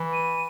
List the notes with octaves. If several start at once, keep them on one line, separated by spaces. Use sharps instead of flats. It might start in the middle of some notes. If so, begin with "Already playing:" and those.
Already playing: E3
D#7